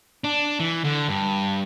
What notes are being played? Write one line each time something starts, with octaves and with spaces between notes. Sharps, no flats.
D4
E3
D3
G2